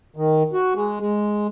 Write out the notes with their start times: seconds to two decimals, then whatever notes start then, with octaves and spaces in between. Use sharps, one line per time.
0.16 D#3
0.53 F#4
0.75 G#3
1.00 G#3